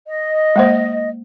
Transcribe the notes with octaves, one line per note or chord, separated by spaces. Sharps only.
D#5
G#3 A#3 C5